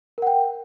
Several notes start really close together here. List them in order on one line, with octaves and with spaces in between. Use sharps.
A#4 F#5 G5